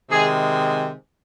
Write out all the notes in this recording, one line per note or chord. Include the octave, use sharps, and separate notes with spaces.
C3 D#3 G#3 G#4